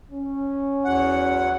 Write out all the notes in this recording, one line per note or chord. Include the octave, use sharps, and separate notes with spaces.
C#4
E2 F#3 F#5